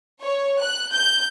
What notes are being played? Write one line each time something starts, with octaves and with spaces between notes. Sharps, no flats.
C#5
F#6
G6